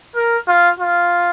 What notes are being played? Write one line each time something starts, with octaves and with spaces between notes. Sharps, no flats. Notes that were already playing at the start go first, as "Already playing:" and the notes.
A#4
F4
F4